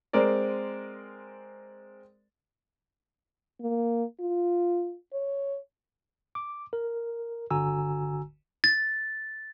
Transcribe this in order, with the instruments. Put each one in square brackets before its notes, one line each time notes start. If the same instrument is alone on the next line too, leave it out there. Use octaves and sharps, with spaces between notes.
[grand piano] G#3 C4 A#4 D5
[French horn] A#3
F4
C#5
[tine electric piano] D6
A#4
G1 D3 F#4 G#5 A#5 E6
[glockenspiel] A6